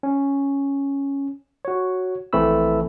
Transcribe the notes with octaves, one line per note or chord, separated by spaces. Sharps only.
C#4
F#4 C#5
A#1 E3 A3 C4 B5 E6